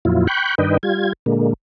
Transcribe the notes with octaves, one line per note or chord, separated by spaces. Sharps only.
F2 A#2 F#3 E4 F4
G5 B5 C#6 F#6 G6
G2 D#3 D4 B4 D#5 G5
G3 F4 G#6
A#2 D3 G#3 A#3